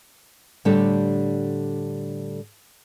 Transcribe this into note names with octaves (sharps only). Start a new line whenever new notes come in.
A2 D3 G3 D4 G4 A4